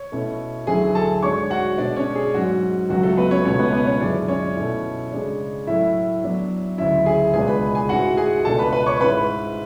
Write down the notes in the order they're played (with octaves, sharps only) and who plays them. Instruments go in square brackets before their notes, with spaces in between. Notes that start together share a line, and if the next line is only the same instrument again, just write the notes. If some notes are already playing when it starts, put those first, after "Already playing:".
Already playing: [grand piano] C#5
B2 A3 C#4 E4
D2 D3 F#3 C#4 E4 G#4 G#5
A4 A5
G#2 G#3 D4 C#5 C#6
F#4 F#5
B2 G#3 B3 D4 D5
C#4 C#5
G#4
G#2 F#3 C#4 F#4
C#2 C#3 F#3 F#4
A3 A4
B3 B4
C#4 C#5
C#2 B2 A3 C#4 C#5
B3 B4
B3 B4
C#4 C#5
F#2 D3 G#3 C#4 D4 E4 D5
C#4 C#5
B2 A3 C#4 E4
C#3 G#3 D4
A2 F#3 A3 E4 E5
A2 F#3 B3 D4
D2 C#3 F#3 C#4 E4 E5
G#4 G#5
C#2 B2 G#3 D4 G#4 G#5
B4 B5
G#4 G#5
G#2 G#3 C#4 E4 F#4 F#5
G#4 G#5
C#2 B2 A3 D4 A4 A5
B4 B5
B4 B5
C#5 C#6
G#2 G#3 C#4 E4 B4 B5